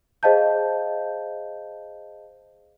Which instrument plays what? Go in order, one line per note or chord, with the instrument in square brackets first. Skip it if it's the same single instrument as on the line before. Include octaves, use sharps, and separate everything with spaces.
[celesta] G#4 C5 D#5 F5 A5 G6